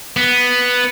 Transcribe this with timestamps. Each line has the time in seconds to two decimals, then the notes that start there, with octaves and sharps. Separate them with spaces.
0.17 B3